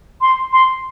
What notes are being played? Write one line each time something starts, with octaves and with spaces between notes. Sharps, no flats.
C6
C6